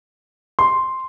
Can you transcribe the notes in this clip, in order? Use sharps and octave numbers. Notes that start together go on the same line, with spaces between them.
C6